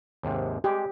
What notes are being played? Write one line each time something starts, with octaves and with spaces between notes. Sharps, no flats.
D#2 G#2 C3
G#3 G4